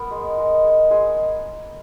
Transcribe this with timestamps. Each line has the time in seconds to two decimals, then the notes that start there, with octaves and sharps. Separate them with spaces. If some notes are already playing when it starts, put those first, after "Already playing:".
Already playing: B3 A#4
0.11 G#3
0.38 G#3
0.65 G#3
0.90 G#3 G#4